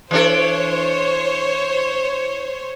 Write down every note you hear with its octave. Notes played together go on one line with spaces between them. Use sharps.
E3 D4 A4 C5 C#5